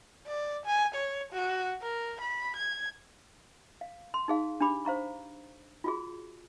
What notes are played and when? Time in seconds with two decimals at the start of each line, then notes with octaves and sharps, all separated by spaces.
0.27 D5
0.66 G#5
0.95 C#5
1.33 F#4
1.82 A#4
2.21 B5
2.57 G#6
3.81 F5
4.14 C6
4.28 D#4 G#4 F5
4.61 D4 G4 B5 D6
4.85 C5 F5 A#5 C#6
5.84 F4 F#4 G#4